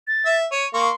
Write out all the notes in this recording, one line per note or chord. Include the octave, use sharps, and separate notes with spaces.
A6
E5
C#5 D#7
A#3 C6 C#6